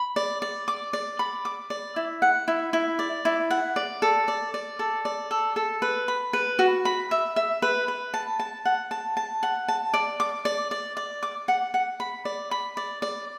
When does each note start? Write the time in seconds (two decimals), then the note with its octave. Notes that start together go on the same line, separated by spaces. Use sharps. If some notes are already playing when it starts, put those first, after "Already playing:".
Already playing: B5
0.16 D5
0.42 D5
0.68 D6
0.93 D5
1.19 B5
1.45 D6
1.70 D5
1.96 E4
2.22 F#5
2.48 E4
2.73 E4
2.99 D5
3.25 E4
3.51 F#5
3.76 D5
4.02 A4
4.28 D5
4.54 D5
4.79 A4
5.05 D5
5.31 A4
5.56 A4
5.82 B4
6.08 B5
6.33 B4
6.59 F#4
6.85 B5
7.11 E5
7.36 E5
7.62 B4
7.88 B4
8.14 A5
8.39 A5
8.65 F#5
8.91 A5
9.17 A5
9.43 F#5
9.68 A5
9.94 D5
10.20 D6
10.45 D5
10.71 D5
10.97 D5
11.23 D6
11.48 F#5
11.74 F#5
12.00 B5
12.25 D5
12.51 B5
12.77 D5
13.02 D5